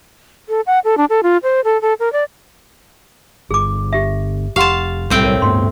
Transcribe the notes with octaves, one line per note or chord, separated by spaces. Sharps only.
A4
F#5
A4
D4
A4
F4
C5
A4
A4
A#4
D5
G1 G#4 D6
G4 E5
F1 G4 F5 F#5 A5 C6
B1 A2 G3 C4 G5
A#4 C#5
G2 A3 B3 C6